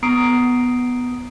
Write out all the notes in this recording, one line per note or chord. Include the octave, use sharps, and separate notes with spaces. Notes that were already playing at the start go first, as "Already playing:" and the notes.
B3 A#5 D#6 C7 D7